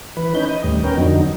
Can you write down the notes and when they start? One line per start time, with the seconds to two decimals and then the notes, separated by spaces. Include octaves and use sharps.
0.17 E3 B4
0.35 C#4 D#4 B4 G6
0.49 D#5
0.64 D#2 A2 G3
0.84 B3 C#4 A#4 G5
0.97 F2 D3 F#3 D#4